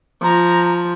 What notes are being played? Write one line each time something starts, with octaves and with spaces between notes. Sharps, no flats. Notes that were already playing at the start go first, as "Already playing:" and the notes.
F3 A#5